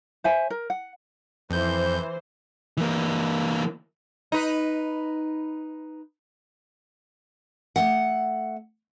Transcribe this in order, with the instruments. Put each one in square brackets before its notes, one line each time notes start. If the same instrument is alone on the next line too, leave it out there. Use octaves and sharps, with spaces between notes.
[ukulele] C5 E5 G#5
A#4
F#5
[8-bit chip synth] F2 G6 [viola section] E3 C5
[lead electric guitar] E3 A#3
[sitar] D#4 B4
[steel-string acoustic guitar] A3 F#5